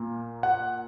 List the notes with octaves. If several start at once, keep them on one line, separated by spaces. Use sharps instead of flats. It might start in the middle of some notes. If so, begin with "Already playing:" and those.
Already playing: A#2 A#3
F#5